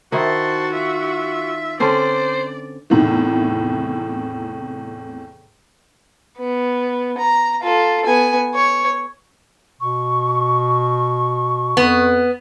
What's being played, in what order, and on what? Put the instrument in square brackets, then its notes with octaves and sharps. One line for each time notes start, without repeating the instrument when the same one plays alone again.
[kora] D#3 E4 [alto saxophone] F#4 [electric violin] C5 A5
[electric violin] F4 E5
[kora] D3 C4 C#4 [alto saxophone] C5 [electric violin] D5
[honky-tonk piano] E2 A2 C3 D#3 E3
[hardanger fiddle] B3
A#5
F4 A4
B3 G#5
C#5
[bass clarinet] B2 [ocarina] C#6
[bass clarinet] F2 [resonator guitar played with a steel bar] B3